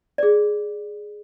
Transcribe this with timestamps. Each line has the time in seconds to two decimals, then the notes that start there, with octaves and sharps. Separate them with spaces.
0.18 G#4 D5